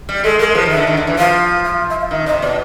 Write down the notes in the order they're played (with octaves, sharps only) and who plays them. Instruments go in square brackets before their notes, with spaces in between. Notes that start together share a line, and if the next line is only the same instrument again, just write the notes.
[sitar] G3
[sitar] G#3 [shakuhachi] A4
[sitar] G#3 [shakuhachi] A#4
[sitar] F3 [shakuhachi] B4
[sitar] D#3
[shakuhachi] E5
[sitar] D3
D#3
D3
E3
[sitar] F3 [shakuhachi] F5
[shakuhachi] F5
E5
F5
[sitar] D#3 [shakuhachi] E5
[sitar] C3 [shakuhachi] D#5
[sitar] B2 [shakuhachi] D5